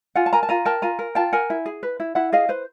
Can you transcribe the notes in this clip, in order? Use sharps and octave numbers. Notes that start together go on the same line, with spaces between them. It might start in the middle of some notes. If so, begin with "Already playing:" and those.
F4 F#5 G#5
A5
A#4 G#5 A#5
A5
F4 G#5 A#5
A#4 G5 A5
F4 G#5 A#5
A#4
F4 G5 A5
A#4 F#5 G#5
E4
G#4
B4
E4
E4 E5 F#5
G#4 D#5 F5
B4 C5